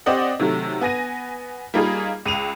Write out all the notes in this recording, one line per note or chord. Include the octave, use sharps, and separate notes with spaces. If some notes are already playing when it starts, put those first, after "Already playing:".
C4 G4 D5 D#5 F#5
C3 D#3 F#3 A3
B3 G#5 A#6 D#7
G3 A#3 D#4 F4 G#4
C#2 D#7 F7